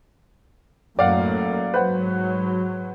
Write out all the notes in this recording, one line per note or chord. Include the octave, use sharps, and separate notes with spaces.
F#2 A2 A#3 D5 F5 F#5
G#2 F#3 B4 C5 F#5